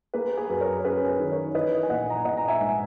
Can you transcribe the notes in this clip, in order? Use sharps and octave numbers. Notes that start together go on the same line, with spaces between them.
A#3 G#4 B4
G#4 B4
F#2
A#4 C#5
C#4 G#4 B4
G#4 B4
D#3
A#4 C#5
E3 B4 D#5
G#5
A#1 D#5 F#5
A#5
G#5
A#1 D#5 F#5
A#5
E5 G#5
G#2